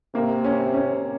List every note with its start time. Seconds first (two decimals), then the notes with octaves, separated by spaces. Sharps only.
0.14 C3 A#3
0.44 C#4
0.74 C#4